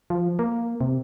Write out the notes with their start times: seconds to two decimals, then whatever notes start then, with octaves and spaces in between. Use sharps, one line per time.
0.10 F3
0.39 A#3
0.81 C3